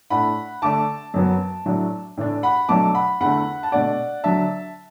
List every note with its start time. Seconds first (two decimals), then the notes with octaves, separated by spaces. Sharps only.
0.10 A2 A3 D4 F#5 B5
0.62 D3 A3 D4 A5 D6
1.14 F#2 F#3 B3
1.66 A2 F#3 A3 D4
2.17 A2 E3 A3 D4
2.43 F#5 B5
2.69 B2 F#3 A3 D4 A5 D6
2.95 F#5 B5
3.20 E2 D3 A3 F#5 B5
3.63 A5
3.72 B2 A3 D4 D5 F#5
4.24 D3 F#3 D4 E5 A5